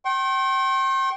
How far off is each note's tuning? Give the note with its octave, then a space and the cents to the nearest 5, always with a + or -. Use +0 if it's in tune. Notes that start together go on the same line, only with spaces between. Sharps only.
G5 -30 C6 +45